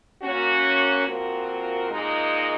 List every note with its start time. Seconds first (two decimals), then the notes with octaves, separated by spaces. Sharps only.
0.22 A#3 C#4 F#4
1.05 A#2 F3 C4 F#4 A#4
1.89 A#2 G#3 D#4